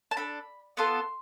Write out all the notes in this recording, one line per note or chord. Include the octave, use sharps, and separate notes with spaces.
A5
D4 A4 B5
B3 F4 A4 C6